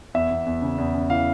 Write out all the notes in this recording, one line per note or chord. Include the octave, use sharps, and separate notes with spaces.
E2 E5
E2
E2
C#3
E2
C#3
E3 F5